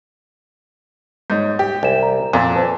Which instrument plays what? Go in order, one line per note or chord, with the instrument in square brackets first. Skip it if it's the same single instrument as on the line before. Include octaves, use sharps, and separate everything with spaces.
[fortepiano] G#2 [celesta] C#5 D#5 G6
[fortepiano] G4
[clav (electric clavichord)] C2 [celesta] G#5 E7
[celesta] A#5
[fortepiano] F2 [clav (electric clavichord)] A#2
[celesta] B4 C5 A5